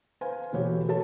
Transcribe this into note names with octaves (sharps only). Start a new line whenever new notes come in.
B4 C5 F5 G#5
E1 E3 A3 F#4 G4 C#5
G#4 A4 C#5 A5